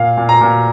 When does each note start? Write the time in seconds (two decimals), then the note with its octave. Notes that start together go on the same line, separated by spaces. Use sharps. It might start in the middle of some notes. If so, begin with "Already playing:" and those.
Already playing: A#2 F5
0.17 A#2
0.29 A#5
0.41 A#2